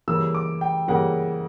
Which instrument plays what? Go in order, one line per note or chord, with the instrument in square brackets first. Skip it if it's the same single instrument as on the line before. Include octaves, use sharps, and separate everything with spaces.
[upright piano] C#3 E3 G3 A#3 [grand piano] E6
[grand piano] D6
G5
[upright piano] C#3 E3 G3 A#3 [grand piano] F#5